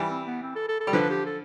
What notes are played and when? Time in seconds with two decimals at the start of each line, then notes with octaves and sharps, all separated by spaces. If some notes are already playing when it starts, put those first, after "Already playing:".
Already playing: E3 G3
0.10 C4
0.27 B3
0.43 C4
0.56 A4
0.69 A4
0.80 A4
0.87 G3
0.93 D3 F3 B4
1.10 G4
1.26 A4